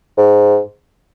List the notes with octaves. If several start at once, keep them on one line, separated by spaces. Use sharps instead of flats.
G#2